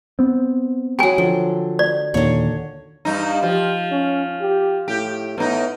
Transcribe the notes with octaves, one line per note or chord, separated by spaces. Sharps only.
B3 C4
F#3 G#3 G5 G#5
D3 F3
D5
D#2 A#2 D3 D#3 C#5
G2 D#4
F3 G4
C#4
G4
A2 G4
A2 B3 D#4